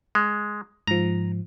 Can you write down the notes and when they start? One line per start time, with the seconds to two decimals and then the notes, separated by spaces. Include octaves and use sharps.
0.15 G#3
0.87 G#2 F3 A#5